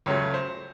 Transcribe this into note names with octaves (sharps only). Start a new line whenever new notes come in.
C#2 C#3 F#3 A3 C#5
C5